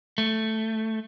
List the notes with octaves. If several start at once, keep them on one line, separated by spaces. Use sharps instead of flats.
A3